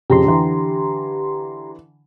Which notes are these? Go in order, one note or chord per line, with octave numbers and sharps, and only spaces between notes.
F2 C#3 G4 A#5 C6
D3 E3